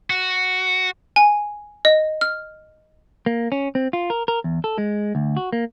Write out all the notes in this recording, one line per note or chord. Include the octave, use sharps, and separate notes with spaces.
F#4
G#5
D#5
F6
A#3
C#4
C4
F4
A#4
A#4
E2
A4
G#3
D2
F#4
A#3